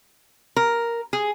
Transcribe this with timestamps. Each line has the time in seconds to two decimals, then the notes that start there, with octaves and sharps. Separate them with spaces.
0.56 A#4
1.13 G#4